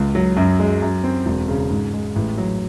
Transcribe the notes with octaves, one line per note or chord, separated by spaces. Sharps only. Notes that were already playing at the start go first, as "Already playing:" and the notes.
Already playing: C#2
F#3
F#2
G#3
F#2
C4
E1
C#3
G#2
G#3
A1
F#3